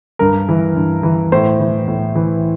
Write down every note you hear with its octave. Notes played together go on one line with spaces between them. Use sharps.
G2 A#4
E3
G2
E3
A2 C5
E3
A2
E3